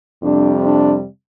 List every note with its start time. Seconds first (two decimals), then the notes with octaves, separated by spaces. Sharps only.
0.23 F2 C3 G3 D4
0.65 D4